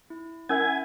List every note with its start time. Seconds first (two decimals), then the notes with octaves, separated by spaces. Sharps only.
0.10 E4
0.49 C#4 E4 A#4 E5 F#5 G#5